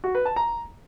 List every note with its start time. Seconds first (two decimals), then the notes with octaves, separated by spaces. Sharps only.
0.04 F#4
0.15 B4
0.26 A5
0.36 A#5